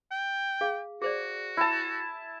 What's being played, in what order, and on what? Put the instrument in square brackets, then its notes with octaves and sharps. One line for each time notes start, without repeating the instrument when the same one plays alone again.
[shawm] G5
[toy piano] G#4 F5
[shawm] F#4 [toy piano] G#4 C5 D5
[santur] E4 A5